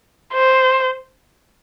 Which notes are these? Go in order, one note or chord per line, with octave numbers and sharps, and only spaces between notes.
C5